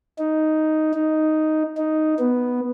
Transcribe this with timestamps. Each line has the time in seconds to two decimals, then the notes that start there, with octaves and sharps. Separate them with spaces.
0.19 D#4
0.94 D#4
1.77 D#4
2.19 B3